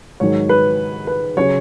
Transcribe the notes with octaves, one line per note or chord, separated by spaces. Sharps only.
G#2 D#3 F#3 C#5
B4
B4
C#3 F#3 C#5